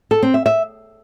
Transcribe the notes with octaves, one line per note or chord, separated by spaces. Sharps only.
A4
C4
E5
E5